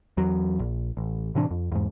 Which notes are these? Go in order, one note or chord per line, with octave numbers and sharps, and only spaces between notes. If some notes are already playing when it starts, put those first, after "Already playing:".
E2 F#3
A#1
A1
A2 C3 E3 D4
F2
E2 G#2